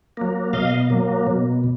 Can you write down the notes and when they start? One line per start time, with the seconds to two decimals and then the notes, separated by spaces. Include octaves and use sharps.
0.17 F#3 A#3
0.53 B2 D#5 F5
0.90 F#3 A#3
1.27 B2